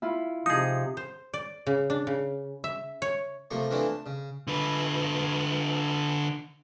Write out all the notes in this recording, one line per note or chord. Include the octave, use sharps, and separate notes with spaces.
E4 F4
C3 F3 D#4 G#4 D#6
C5
D5
C#3
D4
C#3
E5
C#5
C3 F3 A3 A#3 C#6
E3 F3 A3 C4 D4 E4
A5
C#3
D3 B4